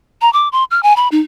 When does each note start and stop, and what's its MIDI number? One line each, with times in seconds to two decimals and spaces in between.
0.22 0.31 82
0.33 0.49 86
0.52 0.64 84
0.71 0.80 89
0.83 0.96 80
0.96 1.08 83
1.12 1.21 63